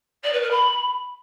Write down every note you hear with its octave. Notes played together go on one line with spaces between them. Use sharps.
D5
B4
A#4
B5